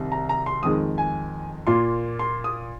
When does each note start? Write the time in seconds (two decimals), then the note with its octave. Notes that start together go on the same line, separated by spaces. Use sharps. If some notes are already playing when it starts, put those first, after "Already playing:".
Already playing: C2 C3 D#3
0.12 A#5
0.29 A#5
0.46 C6
0.63 F2 D#3 G#3 D#6
0.98 G#5
1.67 A#2 A#3 F4 C6
2.19 C6
2.44 D#6